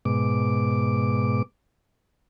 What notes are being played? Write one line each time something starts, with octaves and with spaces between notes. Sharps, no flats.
G#2 B2 D6